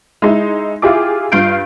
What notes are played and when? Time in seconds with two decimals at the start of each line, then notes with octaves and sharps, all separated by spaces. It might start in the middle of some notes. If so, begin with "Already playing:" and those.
0.22 G#3 D#4 E4
0.82 E4 F4 G4 G#4 D6
1.32 G2 F4 F5 G6 D7